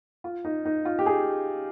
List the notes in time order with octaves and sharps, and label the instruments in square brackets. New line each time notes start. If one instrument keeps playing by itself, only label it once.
[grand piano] F4
D#4
D#4
F4
G4
G#4